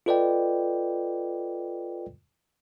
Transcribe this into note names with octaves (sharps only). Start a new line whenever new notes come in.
F4 A4 B4 D5 D#5 G5